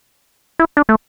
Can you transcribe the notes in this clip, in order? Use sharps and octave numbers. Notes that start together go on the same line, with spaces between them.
E4
D4
A3